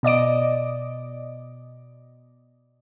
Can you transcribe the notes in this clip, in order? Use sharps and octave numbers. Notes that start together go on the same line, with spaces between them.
B2 D5 D#5 D7